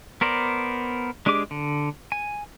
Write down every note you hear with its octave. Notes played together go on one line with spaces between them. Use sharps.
B3 A#4 C5 D5
G#3 D4 G4 G#4 D6
D3
G#5